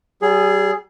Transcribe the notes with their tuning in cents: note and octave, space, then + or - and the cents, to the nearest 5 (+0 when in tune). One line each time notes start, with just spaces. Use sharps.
G3 -35 G#4 +0